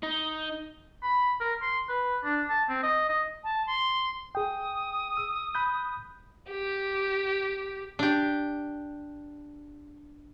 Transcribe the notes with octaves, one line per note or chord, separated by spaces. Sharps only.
D#4
B5
A#4
C6
B4
D4
A5
C4
D#5
D#5
A5
C6
G#4 G5 D#6
E6
B5 F#6 G6
G4
D4 G4